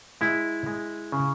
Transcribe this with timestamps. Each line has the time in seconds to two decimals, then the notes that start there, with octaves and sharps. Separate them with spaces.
0.21 G#3 E4
0.66 G#3
1.12 C#3